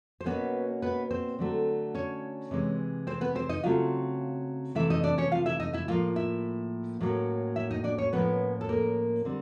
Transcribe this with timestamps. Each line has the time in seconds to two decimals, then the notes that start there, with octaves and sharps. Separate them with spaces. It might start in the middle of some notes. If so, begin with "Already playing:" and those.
0.21 C5
0.26 B2 F#3 A#3 B3 C#4 B4
0.82 B3 B4
1.10 C4 C5
1.39 D3 F#3 A3
1.94 C#4 C#5
2.51 C3 E3 G#3
3.07 C4 C5
3.21 B3 B4
3.35 C4 C5
3.49 D#4 D#5
3.63 C#3 F#3 A3 C4 F4 F5
4.75 C3 E3 A3 E4 E5
4.90 D#4 D#5
5.03 D4 D5
5.18 C#4 C#5
5.32 F4 F5
5.46 E4 E5
5.60 D#4 D#5
5.73 E4 E5
5.88 A2 F3 A#3 F4 F5
6.16 E4 E5
7.00 A2 F#3 A#3 C#4
7.56 E4 E5
7.71 D#4 D#5
7.84 D4 D5
7.98 C#4 C#5
8.13 A2 F3 A#3 B3 C#4 B4
8.61 A4
8.69 A#3 A#4
9.25 D3 G3 C4